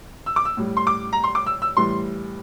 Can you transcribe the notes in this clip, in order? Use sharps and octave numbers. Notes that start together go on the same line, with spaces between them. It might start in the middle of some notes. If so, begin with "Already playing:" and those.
E6
D6
E6
A2 G3
C6
D6
A#5
C6
D6
E6
E6
A2 E3 G3 C6